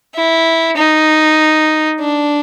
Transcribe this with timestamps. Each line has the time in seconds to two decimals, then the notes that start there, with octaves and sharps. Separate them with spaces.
0.15 E4
0.77 D#4
2.00 D4